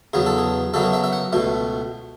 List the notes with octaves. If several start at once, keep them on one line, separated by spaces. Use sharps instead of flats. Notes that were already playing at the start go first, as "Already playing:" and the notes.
E2 C#3 F#3 B3 G#4
A4
G#4
F#2 C#3 F#3 B3 A4
G#4
E5
E5
F#5
C#2 B2 A3